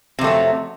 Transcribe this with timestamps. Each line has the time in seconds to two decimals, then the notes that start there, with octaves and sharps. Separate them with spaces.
0.19 C3
0.21 F2
0.24 A3
0.27 F#3